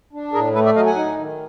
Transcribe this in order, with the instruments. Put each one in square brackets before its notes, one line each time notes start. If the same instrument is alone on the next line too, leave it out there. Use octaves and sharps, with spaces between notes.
[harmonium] D4
A2 G#4 A#4
A3 A4 B4
D5 E5
F#3 D#5 F5
F#5 G#5
D#4
D#3